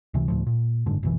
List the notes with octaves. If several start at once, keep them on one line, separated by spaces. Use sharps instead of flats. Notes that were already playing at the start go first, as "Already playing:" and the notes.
C#2 C3 E3
D2 A2 F3
A#2
F#1 G#2 D3
F#1 B1 E3